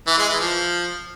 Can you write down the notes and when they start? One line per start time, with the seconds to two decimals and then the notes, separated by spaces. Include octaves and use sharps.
0.07 E3
0.18 G#3
0.29 E3
0.40 F3